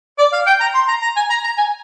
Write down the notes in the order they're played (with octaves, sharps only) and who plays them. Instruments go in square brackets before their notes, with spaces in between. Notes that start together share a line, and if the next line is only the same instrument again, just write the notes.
[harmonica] D5
F5
G5
A#5
C6
A#5
A#5
G#5
A#5
A#5
G#5